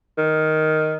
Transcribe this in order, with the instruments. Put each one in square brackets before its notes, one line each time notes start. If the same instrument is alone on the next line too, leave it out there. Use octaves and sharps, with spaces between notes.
[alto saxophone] D#3